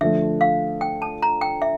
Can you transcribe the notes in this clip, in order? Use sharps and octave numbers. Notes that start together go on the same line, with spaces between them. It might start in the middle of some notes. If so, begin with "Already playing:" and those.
D3 F3 A3 E5
F5
G5
A5
A#5
G5
E5